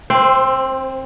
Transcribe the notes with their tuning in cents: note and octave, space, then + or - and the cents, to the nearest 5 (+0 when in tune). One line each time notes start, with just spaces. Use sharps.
C4 +20 C5 -10